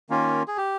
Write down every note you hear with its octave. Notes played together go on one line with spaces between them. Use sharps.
D#3 A#3 C#4 F4
G#4
G4